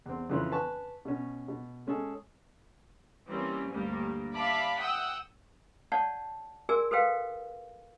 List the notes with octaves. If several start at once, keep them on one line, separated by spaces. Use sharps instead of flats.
E2 C4
F2 C#3 E3 F4 C#5 F#6
B4 G#5 A5 C#6
B2 C#4
B2
G#3 C#4 G#4 A4
E3 G3 A#3 C4 C#4
D2 G2 G3 A#3
D5 E5 F5 A5 B5 D6
F#5 G5 D#6 E6
C#5 D5 F#5 A5
F#4 G#4 A#4 D5 G#5 E6
F#4 A4 B4 C5 F5 G5